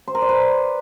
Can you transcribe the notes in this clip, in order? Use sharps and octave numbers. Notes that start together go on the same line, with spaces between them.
C5
A#4
D5
B4